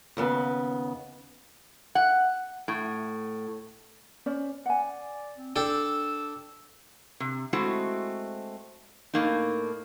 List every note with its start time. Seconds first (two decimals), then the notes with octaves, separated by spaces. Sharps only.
0.17 D#2 C#3 B3
1.95 F#5
2.68 A2
4.26 C#4 C5 D5
4.66 D5 F#5 G#5
5.38 C4
5.56 D4 A4 G5 E6
7.20 C3
7.53 G#3 A3 C4 E4 F#4
9.14 A2 A#3 D#4